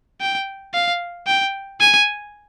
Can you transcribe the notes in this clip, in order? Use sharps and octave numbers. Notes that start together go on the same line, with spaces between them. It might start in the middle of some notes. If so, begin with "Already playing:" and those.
G5
F5
G5
G#5